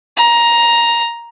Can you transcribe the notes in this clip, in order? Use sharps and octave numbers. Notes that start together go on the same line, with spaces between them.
A#5